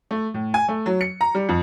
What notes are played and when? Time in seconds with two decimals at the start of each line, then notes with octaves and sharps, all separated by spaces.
0.11 A3
0.34 A2
0.54 G#5
0.68 A3
0.86 F#3
1.01 C#7
1.21 A#5
1.35 G3
1.49 F2